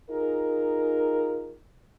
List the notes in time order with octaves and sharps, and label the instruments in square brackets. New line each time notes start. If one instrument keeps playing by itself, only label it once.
[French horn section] D#4 F4 G#4 A#4